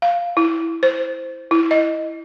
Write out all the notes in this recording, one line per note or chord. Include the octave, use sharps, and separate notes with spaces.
F5
E4
C5
E4
D#5